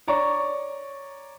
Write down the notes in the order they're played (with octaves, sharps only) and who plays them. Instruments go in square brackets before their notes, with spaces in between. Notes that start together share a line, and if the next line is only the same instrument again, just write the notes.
[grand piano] C#5 D5 A#5 C#6